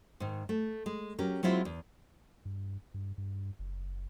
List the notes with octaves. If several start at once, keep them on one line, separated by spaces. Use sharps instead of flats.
G#2 D#3
A3
G#3
F#3 C#4 G4 A#4
F#3 G#3 C4 E4 F4
E2
G2
G2
G2
F#1